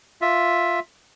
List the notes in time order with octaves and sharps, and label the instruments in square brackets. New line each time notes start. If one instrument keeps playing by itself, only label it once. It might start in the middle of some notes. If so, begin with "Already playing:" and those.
[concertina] F4 E5